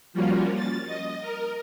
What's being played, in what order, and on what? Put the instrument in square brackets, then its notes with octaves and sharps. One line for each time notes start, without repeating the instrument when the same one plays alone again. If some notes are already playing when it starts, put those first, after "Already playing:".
[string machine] F3 G3 A#3 C#4 F4 F#4
A6
D#5
A#4